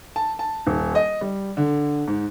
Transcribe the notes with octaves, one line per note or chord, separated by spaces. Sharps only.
A5
A5
D#1
D#5
G3
D3
G#2